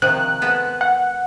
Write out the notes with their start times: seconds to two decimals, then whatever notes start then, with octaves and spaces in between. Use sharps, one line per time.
0.02 C3 D#3 F3 F#6
0.42 G#3 B3 A4
0.81 F#5